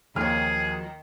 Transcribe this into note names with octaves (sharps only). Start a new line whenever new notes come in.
D#2 D#3 F3 F#3 G#4 F6